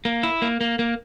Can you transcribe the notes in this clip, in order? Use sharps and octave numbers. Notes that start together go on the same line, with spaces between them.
A#3
E4
A#3
A#3
A#3